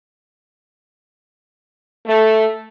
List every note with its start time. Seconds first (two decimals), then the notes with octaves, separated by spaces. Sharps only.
2.06 A3